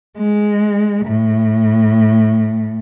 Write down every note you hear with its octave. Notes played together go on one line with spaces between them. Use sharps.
G#3
A2